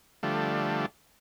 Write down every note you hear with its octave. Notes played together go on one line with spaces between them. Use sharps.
D3 F3 G3 A3